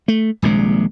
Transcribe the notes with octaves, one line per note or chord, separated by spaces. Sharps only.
A3
D#1 A#1 C3 G#3